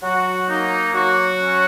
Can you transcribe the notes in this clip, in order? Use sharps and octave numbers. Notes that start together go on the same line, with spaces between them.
F#3 F#4
A#3 D#4
F#3 F#4
C#4